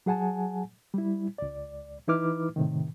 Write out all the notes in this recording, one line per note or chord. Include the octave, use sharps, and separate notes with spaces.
F#3 G#4 F#5 G#5 A5
G3 E4
C#2 D5
E3 D#4 E4 B4 D6 F6
A2 C3 D#3